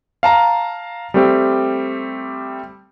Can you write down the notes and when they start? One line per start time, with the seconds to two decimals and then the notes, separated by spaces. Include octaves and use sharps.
0.23 F5 A5 A#5
1.14 G3 A3 C4 G4